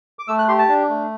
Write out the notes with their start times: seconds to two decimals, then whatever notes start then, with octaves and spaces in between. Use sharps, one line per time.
0.19 D6
0.28 A3 E6
0.39 F#6
0.48 G4 C6
0.59 A5
0.69 D4
0.89 A3